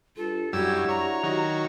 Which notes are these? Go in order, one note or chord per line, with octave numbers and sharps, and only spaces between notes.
G2 F4 A4
F#2 G3 D4 E4 F#4 G4 E6 G#6
C#5 A#5
D#3 F#3 C#5